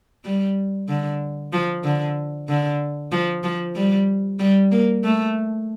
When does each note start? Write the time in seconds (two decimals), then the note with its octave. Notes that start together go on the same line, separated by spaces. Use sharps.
0.25 G3
0.88 D3
1.53 F3
1.84 D3
2.49 D3
3.12 F3
3.43 F3
3.76 G3
4.39 G3
4.72 A#3
5.04 A3